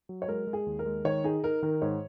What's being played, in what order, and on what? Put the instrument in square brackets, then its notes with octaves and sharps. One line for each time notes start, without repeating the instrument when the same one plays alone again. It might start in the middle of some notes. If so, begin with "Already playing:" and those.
[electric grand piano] F#3
[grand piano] C#5
[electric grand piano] G#3 [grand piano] A#4
[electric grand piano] G#3
[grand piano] G#4
[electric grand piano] D#2
[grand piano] A#4
[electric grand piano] G#3
[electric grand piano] D#3 [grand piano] C#5
[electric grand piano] D#4 [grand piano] G#4
[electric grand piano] D#4 [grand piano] A#4
[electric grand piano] D#3 [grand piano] A#4
[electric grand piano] G#2 [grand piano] C#5